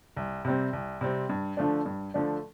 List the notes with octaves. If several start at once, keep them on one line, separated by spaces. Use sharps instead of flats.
C2
C3 G3 C4
C2
C3 G3 C4
G2
D3 F3 A3 D4
G2
D3 F3 A3 D4